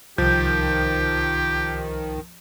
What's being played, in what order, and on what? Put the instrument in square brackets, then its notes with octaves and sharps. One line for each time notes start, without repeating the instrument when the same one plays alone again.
[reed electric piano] C2 G6 [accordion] D#3 [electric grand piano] F3 [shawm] G4